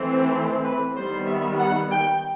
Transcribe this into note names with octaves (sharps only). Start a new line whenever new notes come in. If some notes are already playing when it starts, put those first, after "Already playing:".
Already playing: E3 A3 C4
B4
D#3 G3 B3 C5
E5
F#5
G5